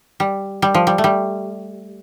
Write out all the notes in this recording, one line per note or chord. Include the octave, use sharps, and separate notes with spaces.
G3
G3
F3
G3
A3
G3